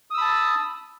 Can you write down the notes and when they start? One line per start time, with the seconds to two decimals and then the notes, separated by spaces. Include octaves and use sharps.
0.10 D#6
0.14 E6
0.18 B5
0.21 A5